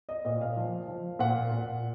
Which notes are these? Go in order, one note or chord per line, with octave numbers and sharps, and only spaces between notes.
D#5
A#2 D#5
F5
F3
F3
A#2 F#5
A#2